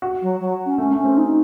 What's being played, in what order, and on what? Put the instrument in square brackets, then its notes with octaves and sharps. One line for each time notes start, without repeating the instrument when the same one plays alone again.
[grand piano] F#4
[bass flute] F#3
F#3
C#4
[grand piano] A3 [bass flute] C#4
[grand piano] A3
[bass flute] C#4
[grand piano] C4
[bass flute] D#4